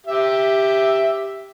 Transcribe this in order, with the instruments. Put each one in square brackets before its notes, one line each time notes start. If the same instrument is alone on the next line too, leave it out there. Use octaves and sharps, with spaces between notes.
[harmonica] G4 E5